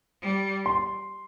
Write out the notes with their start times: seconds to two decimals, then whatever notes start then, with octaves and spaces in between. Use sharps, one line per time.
0.22 G3
0.66 C6